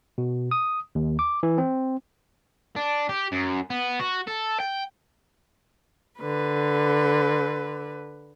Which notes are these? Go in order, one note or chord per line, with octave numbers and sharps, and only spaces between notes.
B2
D#6
D#2
D6
E3
C4
D4
G4
F#2
B3
F#4
A4
G5
D3 B4